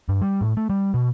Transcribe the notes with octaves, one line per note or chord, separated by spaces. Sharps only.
G2
G3
A2
A3
G3
B2